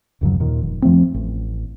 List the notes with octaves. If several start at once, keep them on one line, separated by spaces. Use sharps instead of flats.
D1 F#2 C#3 F#3
D#2 A#2 D#3
F1
F2 F3 A3 C4
A1